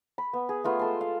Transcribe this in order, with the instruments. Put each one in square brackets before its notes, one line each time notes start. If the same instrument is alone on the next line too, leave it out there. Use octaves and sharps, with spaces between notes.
[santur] B5
B3
G#4
A3 B3 F4
G#3 A4 C6
F5